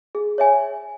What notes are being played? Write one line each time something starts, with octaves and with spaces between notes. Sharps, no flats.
G#4
C#5 E5 G#5